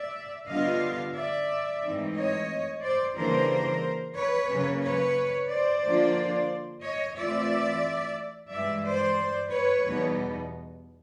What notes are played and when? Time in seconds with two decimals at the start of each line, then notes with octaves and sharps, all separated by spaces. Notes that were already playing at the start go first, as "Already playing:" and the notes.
Already playing: D5 E5
0.49 D3 G3 B3 D4 F4 D#5 F5
1.15 D5 E5
1.83 G#2 E3 A3 C4 D#4
2.17 C#5 D#5
2.83 C5 D5
3.17 C#3 E3 G3 A#3 D4 A#4 C5
4.16 B4 C#5
4.50 C#3 F#3 A#3 C#4
4.83 B4 C#5
5.51 C5 D5
5.83 D3 F3 A#3 D4 F4
6.83 C#5 D#5
7.17 E3 A3 C4 F4 D5 E5
8.51 G2 E3 G#3 D5 E5
8.85 C5 D5
9.51 B4 C#5
9.85 E2 B2 G3 B3 D#4